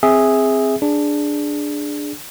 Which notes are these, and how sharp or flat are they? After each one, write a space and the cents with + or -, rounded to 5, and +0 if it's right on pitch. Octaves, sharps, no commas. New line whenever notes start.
C4 +0 G#4 -5 E5 -15
D4 +0 G#4 +0